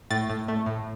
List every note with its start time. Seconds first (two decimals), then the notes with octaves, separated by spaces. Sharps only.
0.10 A2 A6
0.30 A2
0.48 A3
0.66 A2